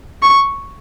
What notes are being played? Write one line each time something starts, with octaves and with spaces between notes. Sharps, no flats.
C#6